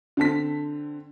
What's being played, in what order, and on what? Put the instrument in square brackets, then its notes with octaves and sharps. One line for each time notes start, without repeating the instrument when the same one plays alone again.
[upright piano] D3 C4 A5 B6